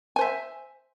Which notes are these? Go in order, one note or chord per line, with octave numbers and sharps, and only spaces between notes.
C5 E5 G#5